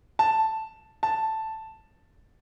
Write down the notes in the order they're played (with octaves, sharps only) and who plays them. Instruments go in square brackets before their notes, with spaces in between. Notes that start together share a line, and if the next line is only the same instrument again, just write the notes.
[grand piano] A5
A5